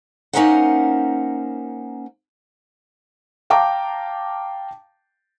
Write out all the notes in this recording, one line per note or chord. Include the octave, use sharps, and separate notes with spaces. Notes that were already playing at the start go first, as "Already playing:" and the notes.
A#3 C#4 D#4 A#4 C5 F#5
F5 G5 A5 A#5 D6